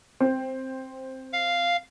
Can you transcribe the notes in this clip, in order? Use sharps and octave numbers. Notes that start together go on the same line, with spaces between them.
C4
F5